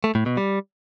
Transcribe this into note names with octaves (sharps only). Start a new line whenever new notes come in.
A3
A2
B2
G3